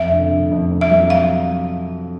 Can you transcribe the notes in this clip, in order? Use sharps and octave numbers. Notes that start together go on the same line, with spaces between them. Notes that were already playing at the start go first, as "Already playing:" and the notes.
Already playing: F2 E5
D3
D3
F2
F2
E5
F#3
F5